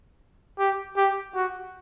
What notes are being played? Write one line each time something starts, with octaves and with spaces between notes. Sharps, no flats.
G4
G4
F#4